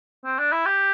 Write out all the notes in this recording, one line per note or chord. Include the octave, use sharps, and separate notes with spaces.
C4
D4
E4
G4